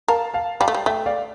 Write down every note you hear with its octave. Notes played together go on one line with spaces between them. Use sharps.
A#4 F5 A5
F5 A5
G3 F5 A5
A3
G3
A3 E5 G5
D5 F5